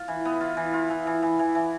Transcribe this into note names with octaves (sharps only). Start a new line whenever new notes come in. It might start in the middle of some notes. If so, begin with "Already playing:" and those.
Already playing: F4
E3
B3
F4
E3
F4
E3
E3
E3
E3
E3